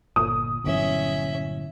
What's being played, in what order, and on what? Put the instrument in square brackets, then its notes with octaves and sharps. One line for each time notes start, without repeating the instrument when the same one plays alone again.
[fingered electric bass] G1 A#2 [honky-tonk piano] D#6
[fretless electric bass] G1 E3 [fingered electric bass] G2 A#2 F#3 [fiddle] C#4 E5